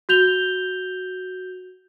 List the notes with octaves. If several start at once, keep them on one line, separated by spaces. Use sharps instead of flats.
F#4 G6 F7 G7